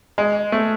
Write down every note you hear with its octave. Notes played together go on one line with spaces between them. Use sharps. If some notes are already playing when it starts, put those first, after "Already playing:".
G#3
A3